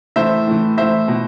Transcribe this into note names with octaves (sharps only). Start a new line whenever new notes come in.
A2 E3 C5 E5
A2 E3
A2 E3 C5 E5
B2